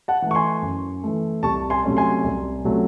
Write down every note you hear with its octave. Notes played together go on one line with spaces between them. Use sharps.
F#5 A5
E3 A3
C#6
G#5 C6
F#2
E3 A3
C2 A5 C#6
G#5 C6
C3 F#3 A3 C#4
G#5 C6
C2
C3 F#3 A3 C#4